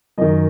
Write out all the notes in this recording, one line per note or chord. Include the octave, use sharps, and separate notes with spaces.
F#2 D#3 D#5